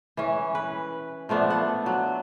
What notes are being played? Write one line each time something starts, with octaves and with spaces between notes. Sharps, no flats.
E3 C#4
B4
F3 A3 B3 D4
F#5
F#3